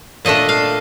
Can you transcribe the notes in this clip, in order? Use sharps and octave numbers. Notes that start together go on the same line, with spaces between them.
A#2 A3 D4 D#5
F5